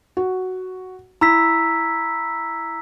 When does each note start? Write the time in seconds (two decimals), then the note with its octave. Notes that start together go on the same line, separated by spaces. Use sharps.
0.17 F#4
1.21 E4 A#5 E6 B6